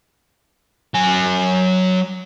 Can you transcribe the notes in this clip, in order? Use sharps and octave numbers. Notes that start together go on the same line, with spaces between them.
F#3 G#5